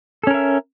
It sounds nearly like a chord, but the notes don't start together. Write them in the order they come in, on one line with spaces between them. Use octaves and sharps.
A4 C#4 A#4 E5